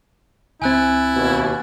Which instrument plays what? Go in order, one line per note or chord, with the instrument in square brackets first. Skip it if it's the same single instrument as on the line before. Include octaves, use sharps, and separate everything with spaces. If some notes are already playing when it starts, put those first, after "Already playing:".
[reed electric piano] C#2 C4 [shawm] E4 [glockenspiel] G#5 F#6 A6
[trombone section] D#2 B2